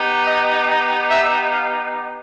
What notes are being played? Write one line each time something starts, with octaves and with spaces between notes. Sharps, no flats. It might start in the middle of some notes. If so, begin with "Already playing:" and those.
Already playing: B3 D#4 G4
D#5
D#5
E5
F5